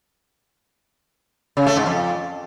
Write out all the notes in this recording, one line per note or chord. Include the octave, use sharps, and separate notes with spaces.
C#3
A3
G#2
F2